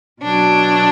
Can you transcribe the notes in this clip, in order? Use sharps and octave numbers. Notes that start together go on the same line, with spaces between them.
B2 F#3 D4